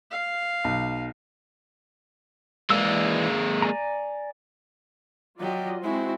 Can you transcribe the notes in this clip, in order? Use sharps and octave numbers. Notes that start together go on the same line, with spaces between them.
F5
B1
E3 G#3 A#3 D5 E6
D5 G#5 A#5
F#3 F4 G4 D5 D#5
G#3 C4 E4 F#4 C5